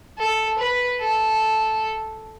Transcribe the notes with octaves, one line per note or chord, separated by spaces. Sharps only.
A4
B4
A4